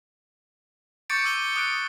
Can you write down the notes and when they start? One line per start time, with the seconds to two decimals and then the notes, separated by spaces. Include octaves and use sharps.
1.10 C#6 D6 G6 A6 C#7 D7
1.25 D6 E6 D#7 G7
1.56 D#6 F#6 D7